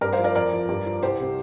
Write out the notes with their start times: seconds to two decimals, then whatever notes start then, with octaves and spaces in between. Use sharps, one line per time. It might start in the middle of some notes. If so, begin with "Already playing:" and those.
0.01 G2 A#4 D5
0.13 C5 F5
0.19 F3
0.24 A#4 D5
0.35 F2 A#4 D5
0.53 F3
0.69 G2
0.86 F3
1.02 C2 G4 C5
1.20 C3 G3